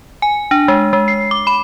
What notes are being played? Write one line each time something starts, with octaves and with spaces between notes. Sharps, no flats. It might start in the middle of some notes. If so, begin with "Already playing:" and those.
G#5
D4
G#3
G#3
C7
D6
B5